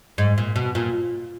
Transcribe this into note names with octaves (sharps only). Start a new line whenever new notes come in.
G#2
A#2
B2
A#2